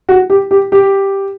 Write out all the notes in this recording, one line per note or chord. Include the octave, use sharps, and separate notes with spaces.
F#4
G4
G4
G4